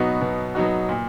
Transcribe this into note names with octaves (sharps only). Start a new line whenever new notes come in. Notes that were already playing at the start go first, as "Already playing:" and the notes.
Already playing: B2 F#3 B3 D#4 F#4
B2
F#3 B3 D#4 F#4
A#2